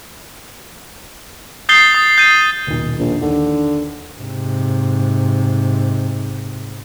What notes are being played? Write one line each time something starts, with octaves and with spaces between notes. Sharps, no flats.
D#6 G6 A6 C7 G7
D#6 A6
G6 A6 D#7
D#1 B1
A#1
D#2 D3
G#2 C3